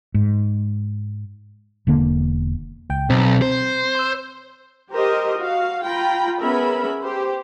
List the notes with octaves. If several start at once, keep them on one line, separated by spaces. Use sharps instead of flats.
G#2
E1 D3 A#3
C#2 G5
B1 C4
C5
C6 E6
G4 A#4 C5 D#5
F#4 F5
F4 G5 A#5 B5
B3 C#4 G#4 A#4 E5 B5
G4 C5